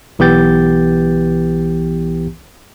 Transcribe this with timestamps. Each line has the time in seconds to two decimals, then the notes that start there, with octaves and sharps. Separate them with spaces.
0.19 B1 E3 B3 G4 G6 A6